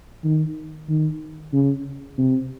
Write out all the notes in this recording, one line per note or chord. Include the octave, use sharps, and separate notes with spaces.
D#3
D#3
C#3
C3